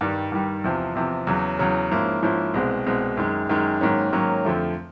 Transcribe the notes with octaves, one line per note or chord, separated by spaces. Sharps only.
G2 D#3 G3
G2 D#3 G3
E2 C3 F3
E2 C3 F3
E2 C#3 F#3
E2 C#3 F#3
G#2 F3 A#3 C#4 E4
G#2 F3 A#3 C#4 E4
C2 B2 G#3 C4
C2 B2 G#3 C4
F#2 D#3 G#3
F#2 D#3 G#3
G#2 D#3 F#3 A#3 C#4
G#2 D#3 F#3 A#3 C#4
F2 D3 F3 A3